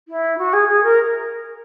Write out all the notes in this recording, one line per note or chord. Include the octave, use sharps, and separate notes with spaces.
E4
F#4
G#4
G#4
A#4